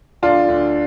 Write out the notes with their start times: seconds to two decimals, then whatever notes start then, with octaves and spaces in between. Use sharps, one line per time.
0.23 D2 D4 F4
0.48 D2